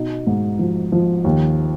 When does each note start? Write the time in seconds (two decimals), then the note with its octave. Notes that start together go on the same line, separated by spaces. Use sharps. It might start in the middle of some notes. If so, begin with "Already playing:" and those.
Already playing: B2 D#4
0.27 G#2
0.59 F3
0.92 F3
1.24 D#2